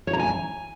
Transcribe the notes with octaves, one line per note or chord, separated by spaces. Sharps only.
C#5
A#5
G#5